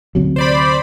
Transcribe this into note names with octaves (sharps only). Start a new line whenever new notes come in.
D2 C3 F#3
C5 D5 B5